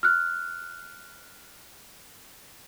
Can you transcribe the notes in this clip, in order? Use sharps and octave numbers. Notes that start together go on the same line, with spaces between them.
F6 F#6